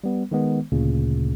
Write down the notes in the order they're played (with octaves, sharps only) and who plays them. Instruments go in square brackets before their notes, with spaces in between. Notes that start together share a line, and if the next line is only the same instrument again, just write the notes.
[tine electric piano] G3 B3
D#3 G#3 B3
D2 A#2 C#3